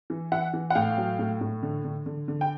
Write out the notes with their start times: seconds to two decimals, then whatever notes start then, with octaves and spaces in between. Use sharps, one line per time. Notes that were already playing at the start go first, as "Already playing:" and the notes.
0.10 E3
0.32 E3 E5 F#5
0.53 E3
0.70 F#5
0.75 A2 F5 G5
0.98 F#3
1.19 A2
1.41 A2
1.63 D3
1.84 D3
2.06 D3
2.28 D3
2.41 G5